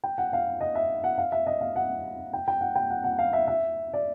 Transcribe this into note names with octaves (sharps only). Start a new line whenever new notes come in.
G5
F#5
F5
D#5
E5
F#5
F5
E5
D#5
F5
F#5
G5
G5
F#5
G5
F#5
F#5
F5
E5
E5
D5